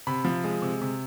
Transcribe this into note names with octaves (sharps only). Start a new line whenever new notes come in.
C3 B5
F3
G#3
C3
C3